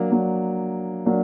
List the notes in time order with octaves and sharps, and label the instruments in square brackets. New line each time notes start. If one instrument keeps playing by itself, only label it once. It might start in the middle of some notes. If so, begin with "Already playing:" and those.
Already playing: [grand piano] F#3 A#3 D4
F#3 A#3 D4
F#3 A#3 D4